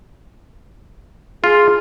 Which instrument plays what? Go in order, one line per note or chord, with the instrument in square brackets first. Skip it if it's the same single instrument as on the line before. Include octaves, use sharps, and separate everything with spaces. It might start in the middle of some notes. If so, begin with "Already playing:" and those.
[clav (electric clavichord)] F4 [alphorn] G#4